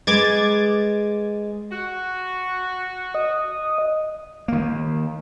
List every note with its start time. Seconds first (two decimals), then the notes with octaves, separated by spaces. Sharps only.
0.07 G#3 B4 D6 G#6 A6
1.71 F#4
3.15 D#5
4.48 D#3 A#3